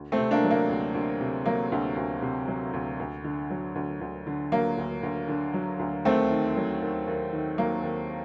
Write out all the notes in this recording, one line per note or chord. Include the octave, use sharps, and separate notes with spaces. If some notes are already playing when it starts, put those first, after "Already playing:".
Already playing: D2
A3 C4
C3
A#3 D4
F#3
A#3
D2
D2
C3
F#3 A#3
D2
D2
C3
F#3
D2
D2
D3
F#3
D2
D2
D3
F#3 A#3
D2
D2
D3
F#3
D2
D#2 A3 C4
D#3
F#3
D#2
D#2
D#3
F#3 A#3
D#2